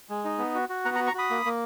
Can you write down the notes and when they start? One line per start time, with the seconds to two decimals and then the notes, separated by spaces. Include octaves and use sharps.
0.09 G#3
0.24 D#4
0.39 B3
0.55 F#4
0.69 F#4
0.85 B3 F#5 A#5
0.95 F#5 A#5
1.00 F#4
1.07 A#5 C#6
1.14 F#4 B5 D#6
1.30 A#3
1.46 A#3